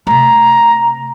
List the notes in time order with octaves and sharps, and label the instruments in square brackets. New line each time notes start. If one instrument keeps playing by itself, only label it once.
[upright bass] C3 A3 [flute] A#5